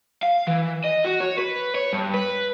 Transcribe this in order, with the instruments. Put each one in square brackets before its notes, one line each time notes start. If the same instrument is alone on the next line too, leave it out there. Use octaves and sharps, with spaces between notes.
[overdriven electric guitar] F5
E3
D#5
F#4
C#5
B4
C#5
G2
B4